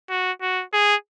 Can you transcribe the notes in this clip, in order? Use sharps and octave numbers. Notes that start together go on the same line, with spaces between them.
F#4
F#4
G#4